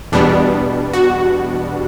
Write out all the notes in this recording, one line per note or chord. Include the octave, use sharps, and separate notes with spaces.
E2 B2 G3 B3 D4
F#4